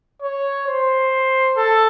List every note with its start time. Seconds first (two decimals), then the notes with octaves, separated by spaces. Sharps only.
0.22 C#5
0.68 C5
1.57 A4